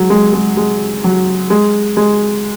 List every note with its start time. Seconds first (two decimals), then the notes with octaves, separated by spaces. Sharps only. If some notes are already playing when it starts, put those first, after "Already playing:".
Already playing: F#3 G#3
0.10 G#3
0.33 G#3
0.57 G#3
1.04 F#3
1.50 G#3
1.97 G#3